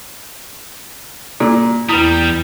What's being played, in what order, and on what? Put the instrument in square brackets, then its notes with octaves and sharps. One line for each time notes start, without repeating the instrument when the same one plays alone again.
[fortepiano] A#2 [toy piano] A4
[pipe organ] E2 [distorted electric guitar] G3 [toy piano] E4 B4 [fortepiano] D#6